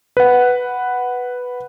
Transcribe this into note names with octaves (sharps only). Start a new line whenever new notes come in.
B4 F#5